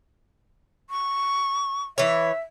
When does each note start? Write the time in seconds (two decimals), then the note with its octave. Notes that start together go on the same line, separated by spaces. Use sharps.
0.90 C#6
1.98 E3 C#5 E5